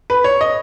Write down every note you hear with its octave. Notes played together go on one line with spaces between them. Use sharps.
B4
C#5
D#5